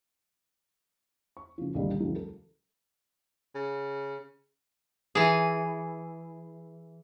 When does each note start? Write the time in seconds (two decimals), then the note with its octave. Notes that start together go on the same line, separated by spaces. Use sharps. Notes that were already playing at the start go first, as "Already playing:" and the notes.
1.37 C#6
1.58 C#3 F3
1.74 C#2 A#2 D3 D#3 G3 G#3
1.99 C#2 E3 F#3 G#3
2.16 A4
3.55 C#3
5.15 E3 G#4